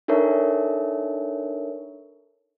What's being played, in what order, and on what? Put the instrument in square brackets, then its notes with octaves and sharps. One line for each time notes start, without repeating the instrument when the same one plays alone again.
[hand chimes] D4 D#4 A4 A#4 C#5 E5